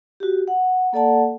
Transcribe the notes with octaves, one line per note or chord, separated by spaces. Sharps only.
F#4 G4
F#5
A#3 A4 D5 F#5 A5